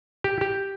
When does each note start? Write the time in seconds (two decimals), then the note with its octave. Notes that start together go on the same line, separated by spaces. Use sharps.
0.24 G4
0.41 G4